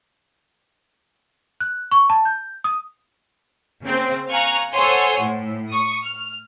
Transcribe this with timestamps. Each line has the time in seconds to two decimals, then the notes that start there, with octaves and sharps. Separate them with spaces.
1.60 F#6
1.92 C#6
2.10 A5
2.25 G6
2.64 D#6
3.84 C#3 A#3 C4
4.29 F5 G#5 A#5 C#6 F6 F#6
4.73 A4 C5 C#5 F#5 G#5 C6
5.20 A2
5.70 C#6 D#6
6.03 F6